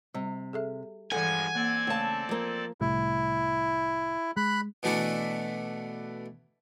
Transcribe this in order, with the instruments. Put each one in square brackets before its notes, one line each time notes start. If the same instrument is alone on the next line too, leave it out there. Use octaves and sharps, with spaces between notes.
[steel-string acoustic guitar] C3 [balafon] G3
[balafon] G#4 A4 E5
[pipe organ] G2 F3 G#3 [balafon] E3 A4 [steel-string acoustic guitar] F#5 [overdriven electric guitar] G#5
[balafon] A#3 [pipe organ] C4 A4 D5
[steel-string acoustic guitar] C#3 A5 [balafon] A3 F5
[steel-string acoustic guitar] F3 A#3
[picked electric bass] C2 A2 G3 [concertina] E4
[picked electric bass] G#3 [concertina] B5 F#6
[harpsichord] B2 E3 A3 B3 D4 E4